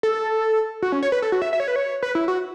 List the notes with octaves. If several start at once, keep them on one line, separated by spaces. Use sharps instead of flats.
A4
F#4
C#4
C#5
B4
A4
F#4
E5
E5
C#5
B4
C#5
B4
E4
F#4